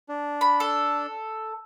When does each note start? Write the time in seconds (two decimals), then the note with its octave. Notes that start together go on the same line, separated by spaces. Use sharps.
0.09 D4
0.41 B5
0.60 A4